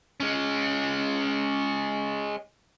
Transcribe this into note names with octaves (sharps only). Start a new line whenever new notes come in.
G#3 C#4